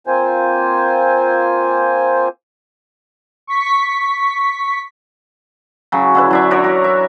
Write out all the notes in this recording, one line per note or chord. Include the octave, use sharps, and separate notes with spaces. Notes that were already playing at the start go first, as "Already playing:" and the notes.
A#3 C4 F4 C5 G#5
C#6 B6
C#3 F#3
D3 E4 B4
F#3 D4 E5
D4 F#4 A#4 C#5
F#4 A#4
E5